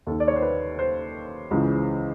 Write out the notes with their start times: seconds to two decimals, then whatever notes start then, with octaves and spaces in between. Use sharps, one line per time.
0.07 D#2 D#3 A4
0.20 D5
0.28 C#5
0.36 C5
0.42 B4
0.79 C5
1.51 C#2 C#3 E3